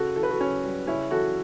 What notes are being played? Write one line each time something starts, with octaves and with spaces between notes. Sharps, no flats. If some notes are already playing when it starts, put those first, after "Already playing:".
Already playing: C#3 F#4 A4
E3 A4
B4
F#4 A4
C#3 C#4
G3
C#3 C#4 E4
E3 F#4 A4